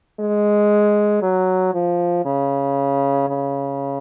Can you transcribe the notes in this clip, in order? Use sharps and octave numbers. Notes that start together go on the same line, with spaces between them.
G#3
F#3
F3
C#3
C#3